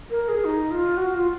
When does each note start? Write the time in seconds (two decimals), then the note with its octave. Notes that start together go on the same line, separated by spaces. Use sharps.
0.11 A#4
0.29 G#4
0.45 D#4
0.71 F4
0.97 F#4
1.15 F4